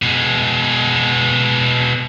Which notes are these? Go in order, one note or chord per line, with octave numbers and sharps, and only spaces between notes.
B2 G#3